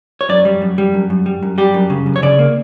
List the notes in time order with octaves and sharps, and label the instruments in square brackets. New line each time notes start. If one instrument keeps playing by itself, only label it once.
[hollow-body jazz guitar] C#5
F#2 D5
G3
F#2
G3
F#2
F#2
G3
F#2
G3 G4
F#2
C#3
F#2
C#5
C#3 D5
A#3